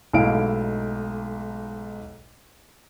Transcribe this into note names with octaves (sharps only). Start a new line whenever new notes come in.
B1 G#2 A3 E4 F5 D7